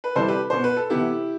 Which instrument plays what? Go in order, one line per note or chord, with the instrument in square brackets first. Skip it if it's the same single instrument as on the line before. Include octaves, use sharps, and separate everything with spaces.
[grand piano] B4
C3 E3 G3 C4 A4 C5
G4 B4
B2 B3 C5
B4
A4
C3 E3 B3 E4 G4